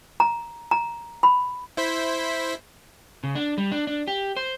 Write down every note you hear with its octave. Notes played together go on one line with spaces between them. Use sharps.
A#5
A#5
B5
E4 C5 B6
C#3
D4
G3
D4
D4
G4
C5